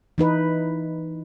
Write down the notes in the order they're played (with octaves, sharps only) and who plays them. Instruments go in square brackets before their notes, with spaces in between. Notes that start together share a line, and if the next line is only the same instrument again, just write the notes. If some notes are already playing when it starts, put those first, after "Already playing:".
[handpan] E3 D#4 B4